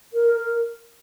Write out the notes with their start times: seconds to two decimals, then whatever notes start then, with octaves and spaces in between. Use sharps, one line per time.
0.14 A#4
0.34 A#4